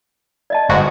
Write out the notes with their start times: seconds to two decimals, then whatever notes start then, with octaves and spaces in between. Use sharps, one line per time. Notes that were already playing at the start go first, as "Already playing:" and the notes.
0.50 D5 D#5 A5
0.69 G1 G#2 F#4